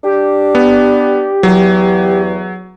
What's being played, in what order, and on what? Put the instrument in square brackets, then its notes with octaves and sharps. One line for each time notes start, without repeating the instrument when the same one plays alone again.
[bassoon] D4 [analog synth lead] G4
[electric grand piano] B3
[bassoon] E2 [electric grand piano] F#3